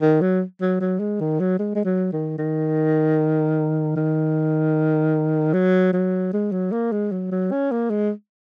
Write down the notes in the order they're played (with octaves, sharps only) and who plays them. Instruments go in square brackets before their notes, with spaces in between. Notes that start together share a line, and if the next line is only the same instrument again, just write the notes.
[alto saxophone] D#3
F#3
F#3
F#3
G#3
D#3
F#3
G#3
G#3
F#3
D#3
D#3
D#3
F#3
F#3
G#3
F#3
A#3
G#3
F#3
F#3
C#4
A#3
G#3